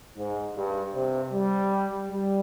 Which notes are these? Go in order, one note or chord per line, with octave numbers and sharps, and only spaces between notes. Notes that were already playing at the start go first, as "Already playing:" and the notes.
G#2
G2
C3
G3
G3